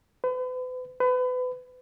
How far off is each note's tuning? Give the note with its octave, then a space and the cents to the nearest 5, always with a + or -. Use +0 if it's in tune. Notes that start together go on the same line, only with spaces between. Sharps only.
B4 +40
B4 +30